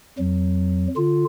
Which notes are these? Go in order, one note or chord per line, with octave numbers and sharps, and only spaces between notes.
F2 F#3
D3 F4